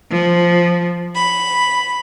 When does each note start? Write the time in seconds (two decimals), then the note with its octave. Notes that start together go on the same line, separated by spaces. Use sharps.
0.11 F3
1.15 B5